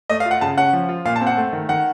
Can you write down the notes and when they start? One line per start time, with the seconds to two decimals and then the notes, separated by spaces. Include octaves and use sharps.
0.10 A3 D#5
0.20 F5
0.26 F4
0.31 F#5
0.41 C#3 A5
0.58 C#4 F#5
0.73 F3
0.89 F4
1.05 A#2 F5
1.16 A5
1.21 C4
1.27 F#5
1.37 A3
1.53 D#3
1.69 D#3 F#5